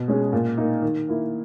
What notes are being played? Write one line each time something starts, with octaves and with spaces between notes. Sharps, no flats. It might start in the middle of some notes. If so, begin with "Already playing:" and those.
Already playing: B2
G#3 C#4 G#4
A#2
A#3 D#4
D#3
A#3 E4